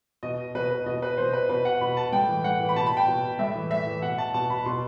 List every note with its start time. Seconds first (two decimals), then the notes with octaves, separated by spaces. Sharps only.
0.23 B2 D#5
0.55 B2 B4
0.71 B4
0.86 B2 D#5
1.02 B4
1.18 B2 C5
1.33 B4
1.49 B2 B4
1.65 F#5
1.81 B2 B5
1.97 A5
2.12 A2 G5
2.29 E3
2.44 A2 F#5
2.60 E3
2.69 B5
2.76 B2 A5
2.87 B5
2.97 G5
3.08 B2
3.39 A2 E5
3.55 E3
3.71 A2 E5
3.87 E3
4.02 B2 F#5
4.18 A5
4.34 B2 A5
4.50 B5
4.66 B2 C6